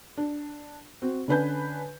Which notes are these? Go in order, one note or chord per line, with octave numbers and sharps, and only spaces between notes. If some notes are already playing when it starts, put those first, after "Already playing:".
D4
C4 F#4
D3 C#4 D4 B4 G#5 G6